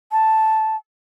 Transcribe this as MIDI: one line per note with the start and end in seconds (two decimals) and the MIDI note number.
0.12 0.76 81